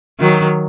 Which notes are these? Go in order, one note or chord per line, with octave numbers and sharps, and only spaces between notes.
D#3 F#3